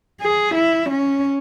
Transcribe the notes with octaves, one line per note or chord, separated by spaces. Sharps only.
G#4
E4
C#4